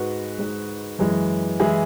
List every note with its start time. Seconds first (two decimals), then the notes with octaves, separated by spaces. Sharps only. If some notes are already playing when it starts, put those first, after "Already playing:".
Already playing: G#2 G#3 F#4 B4
0.38 G#2 G#3
0.99 F#2 E3 G#3
1.60 E3 G#3 E4 G#4